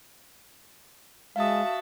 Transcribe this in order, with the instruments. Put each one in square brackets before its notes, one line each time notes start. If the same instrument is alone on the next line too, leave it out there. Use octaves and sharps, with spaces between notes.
[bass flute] G#3 [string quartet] F#4 E5 A5 [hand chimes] F5 D#6